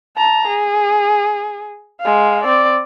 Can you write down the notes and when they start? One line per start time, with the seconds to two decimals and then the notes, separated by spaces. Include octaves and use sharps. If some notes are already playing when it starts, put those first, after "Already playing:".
0.17 A5 A#5
0.48 G#4
2.01 G#3 F5
2.44 C4 D5